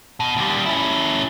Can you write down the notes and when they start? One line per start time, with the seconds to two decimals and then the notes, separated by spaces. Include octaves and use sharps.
0.20 B2
0.37 D#2 G3
0.66 C#4 E4